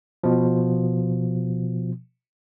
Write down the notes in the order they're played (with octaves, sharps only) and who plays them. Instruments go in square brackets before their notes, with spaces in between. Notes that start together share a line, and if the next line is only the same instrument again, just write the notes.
[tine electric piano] B2 F3